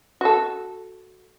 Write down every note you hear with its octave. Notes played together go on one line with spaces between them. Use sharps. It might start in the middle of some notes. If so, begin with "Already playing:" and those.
F#4 A4